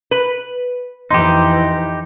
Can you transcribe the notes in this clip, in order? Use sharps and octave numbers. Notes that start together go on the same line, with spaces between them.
B4
F2 E3 D#4 G4 C6